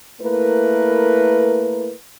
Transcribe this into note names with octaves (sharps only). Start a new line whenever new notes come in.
A3 A#3 E4 A#4 B4